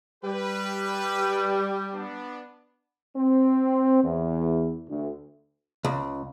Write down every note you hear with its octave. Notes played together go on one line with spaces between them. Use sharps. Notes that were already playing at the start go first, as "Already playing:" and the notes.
G3 G4 B4
B3 D4
C4
E2
D2
C#2